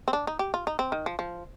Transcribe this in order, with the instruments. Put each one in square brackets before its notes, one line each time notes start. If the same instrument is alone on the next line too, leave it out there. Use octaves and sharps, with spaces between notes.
[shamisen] C4
D4
D#4
G4
F4
D#4
C4
D#3
F3
F3